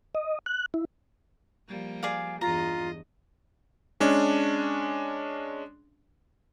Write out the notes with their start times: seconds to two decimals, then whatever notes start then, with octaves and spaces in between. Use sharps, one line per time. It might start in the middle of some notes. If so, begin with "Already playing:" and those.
0.15 D#5
0.46 F#6
0.74 E4
1.68 F3 G3 A#3
2.03 G#4 D5 F5
2.41 E2 G2 F4 D#5 A#5
4.00 G#3 C#4 D4